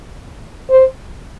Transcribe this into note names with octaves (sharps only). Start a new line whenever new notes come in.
C5